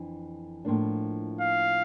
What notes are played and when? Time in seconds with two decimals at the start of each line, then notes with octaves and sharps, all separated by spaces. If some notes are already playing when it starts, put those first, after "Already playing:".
Already playing: F2 E3 D4
0.65 A2 F3 A#3 D4
1.40 F5